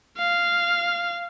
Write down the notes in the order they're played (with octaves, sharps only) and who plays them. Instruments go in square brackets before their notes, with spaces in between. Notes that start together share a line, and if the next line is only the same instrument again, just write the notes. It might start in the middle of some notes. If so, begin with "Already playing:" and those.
[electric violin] F5